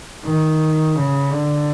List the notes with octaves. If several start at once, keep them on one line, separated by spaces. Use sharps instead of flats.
D#3
C#3
D3